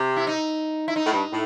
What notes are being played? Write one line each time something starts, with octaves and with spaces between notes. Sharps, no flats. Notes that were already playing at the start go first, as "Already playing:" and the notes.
Already playing: C3
E4
D#4
E4
D#4
A2
G2
A2